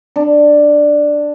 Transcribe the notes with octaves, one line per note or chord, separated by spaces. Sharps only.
D4